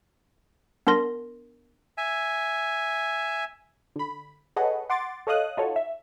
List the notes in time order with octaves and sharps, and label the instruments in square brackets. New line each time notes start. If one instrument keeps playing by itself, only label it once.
[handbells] B3 D4 A#4 C6 A#6
[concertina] E5 G#5
[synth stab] D3 B5
G#4 A4 B4 C#5 D#5 F#5
F#5 C6 D6 A6
A4 C#5 D#5 F5 D#6 F#6
D#4 F4 F#4 A4 C#5
E5